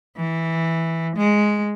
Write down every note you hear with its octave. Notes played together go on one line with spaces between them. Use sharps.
E3
G#3